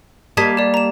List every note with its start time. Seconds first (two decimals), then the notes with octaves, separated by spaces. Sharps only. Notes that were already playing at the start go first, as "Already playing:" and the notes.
0.37 G3 A#3 D#5 A5 G#6 B6
0.57 G4 D5
0.74 A#5 E7